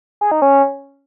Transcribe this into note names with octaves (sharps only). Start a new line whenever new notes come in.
G#4
D#4
C#4